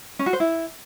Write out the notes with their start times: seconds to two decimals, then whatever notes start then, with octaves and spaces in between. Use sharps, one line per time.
0.19 C#4
0.26 F#4
0.33 C5
0.40 E4